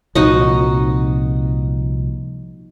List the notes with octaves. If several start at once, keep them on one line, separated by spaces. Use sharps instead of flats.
C2 A#2 F3 D#4 F#4 D#5